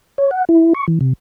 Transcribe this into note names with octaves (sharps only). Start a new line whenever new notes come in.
C#5
F#5
E4
C#6
E3
C3